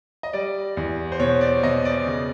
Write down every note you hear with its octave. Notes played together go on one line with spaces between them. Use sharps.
D#5
G3 D5
E2
C5
B2 C#5
D5
B2 D#5
D5
C#3